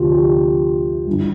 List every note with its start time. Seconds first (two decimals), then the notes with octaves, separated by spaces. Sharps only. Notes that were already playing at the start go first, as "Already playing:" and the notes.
Already playing: D2 C3 F3 F4 G4
0.13 G4
1.06 G2 E3